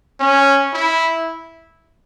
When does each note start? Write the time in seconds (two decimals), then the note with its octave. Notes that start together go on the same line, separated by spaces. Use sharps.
0.20 C#4
0.74 E4